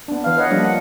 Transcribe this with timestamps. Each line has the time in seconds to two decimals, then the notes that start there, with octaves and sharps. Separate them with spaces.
0.08 B3 D4
0.24 E3 F5
0.37 B4 C#5 D#5 F#5
0.51 F3 G3 A#3 D4
0.64 F#5